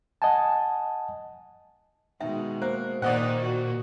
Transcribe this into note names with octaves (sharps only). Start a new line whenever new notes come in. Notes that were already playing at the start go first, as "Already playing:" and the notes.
D#5 F#5 G#5 A5
B2 D#3 G#3 E5
A#3 C5
A#2 D#3 A#3 D#4 C5 D5 D#5 F#5
F#4